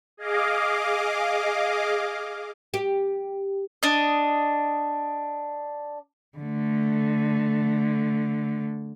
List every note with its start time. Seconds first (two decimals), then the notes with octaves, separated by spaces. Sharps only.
0.17 G#4 D#5 F5 D6
2.74 G4
3.83 D4 D#5
6.38 D3 A3